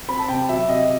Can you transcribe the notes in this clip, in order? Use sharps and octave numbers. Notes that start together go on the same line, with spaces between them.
C4 B5
A5
C3 G5
F#3 E5
C3 D#5